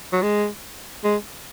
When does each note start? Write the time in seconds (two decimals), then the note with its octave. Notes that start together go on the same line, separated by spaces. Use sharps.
0.13 F#3
0.22 G#3
1.04 G#3